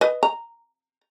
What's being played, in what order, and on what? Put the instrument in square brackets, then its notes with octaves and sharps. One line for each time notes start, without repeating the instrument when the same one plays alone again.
[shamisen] B4 D#5
A#5